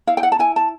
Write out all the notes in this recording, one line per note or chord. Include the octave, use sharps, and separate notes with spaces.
E4 F5
G5
F#5
A5
E4 G#5
A5